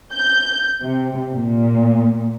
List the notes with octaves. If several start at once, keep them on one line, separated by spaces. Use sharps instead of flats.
G6
C3
A#2